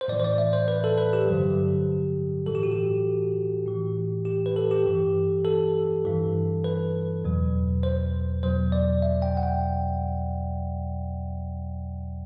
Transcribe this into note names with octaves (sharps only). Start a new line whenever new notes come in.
C5
A2 E3 D5
C5
D5
E5
C5
B4
A4
B4
G4
G2 D3 F#3
A2 E3 A4
G4
F#4
G4
A2 E3
G4
B4
A4
G4
G2 E3
A4
G2 E3
B4
E2 B2 F#3
C5
E2 B2 F#3 C5
D5
E5
G5
F#5
G5